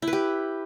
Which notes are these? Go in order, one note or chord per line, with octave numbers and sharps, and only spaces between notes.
E4
B4
G4